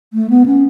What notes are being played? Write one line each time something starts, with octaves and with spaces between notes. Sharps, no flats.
A3
B3
C#4